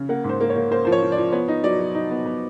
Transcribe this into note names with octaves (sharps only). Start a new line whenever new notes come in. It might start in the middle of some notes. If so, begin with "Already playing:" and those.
Already playing: C#3
A#3 F#5
G#2 C5
A#3
C#5
A#3
A#3 C5
F3 C5
C#5
F3
D5
F3
B3 C#5
D#4
F#3 D5
F#3
D#4
B3
B3